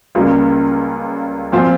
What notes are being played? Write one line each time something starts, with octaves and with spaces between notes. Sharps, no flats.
C#2 C#3 G3 A#3 F4
A#2 F3 C4 F4